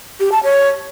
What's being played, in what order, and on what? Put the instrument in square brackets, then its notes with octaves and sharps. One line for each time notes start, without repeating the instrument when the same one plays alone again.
[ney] G4
A5
C#5